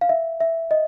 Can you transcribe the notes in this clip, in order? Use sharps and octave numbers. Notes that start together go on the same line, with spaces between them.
F5
E5
E5
D#5